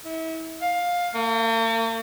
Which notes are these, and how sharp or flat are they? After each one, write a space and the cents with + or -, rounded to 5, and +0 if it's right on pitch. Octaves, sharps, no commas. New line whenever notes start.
E4 -35
F5 +15
A#3 -45